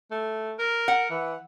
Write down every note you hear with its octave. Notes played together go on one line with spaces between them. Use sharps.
A3
A#4
F#5
E3